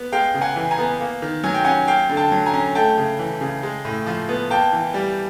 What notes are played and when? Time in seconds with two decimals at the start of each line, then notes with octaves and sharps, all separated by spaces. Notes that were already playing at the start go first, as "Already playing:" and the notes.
Already playing: B3
0.12 G#3 F5 G5
0.34 C#3
0.41 F#5 G#5
0.56 E3
0.71 G#5 A#5
0.79 B3
1.00 A#3
1.22 D#3
1.44 F#3 G#5
1.54 G5
1.64 C#4 F#5 G#5
1.87 A#3 F5 G5
2.09 D3
2.17 G5 A5
2.32 F#3
2.46 G#5 A#5
2.53 C#4
2.75 A3 G5 A5
2.97 C#3
3.19 E3
3.41 C#3
3.63 G#3
3.85 A2
4.06 F3
4.29 B3
4.50 A#3 G5 A5
4.72 E3
4.94 G3